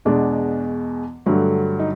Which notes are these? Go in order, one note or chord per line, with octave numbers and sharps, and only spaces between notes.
E2 B2 G#3 D4
G2 D3 F#3 A3
D#4